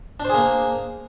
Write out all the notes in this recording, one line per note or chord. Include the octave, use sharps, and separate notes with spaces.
A#3 D4 G#4 C5